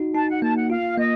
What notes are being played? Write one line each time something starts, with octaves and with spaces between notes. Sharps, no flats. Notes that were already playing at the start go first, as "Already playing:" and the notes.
Already playing: D#4 F#4
D#4 A5
F#5
A#3 A5
F#5
F4 F5
A#3 D#5